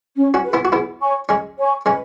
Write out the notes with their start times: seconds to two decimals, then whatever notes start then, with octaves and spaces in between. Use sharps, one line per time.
0.16 C#4
0.34 C#4 F#4
0.44 G#4 B4
0.53 B3 E4
0.65 F#4
0.72 B3 E4 G#4
1.02 C#5 G#5 C#6
1.29 G#3 C#4 G#4
1.57 C#5 G#5 C#6
1.86 G#3 C#4 B4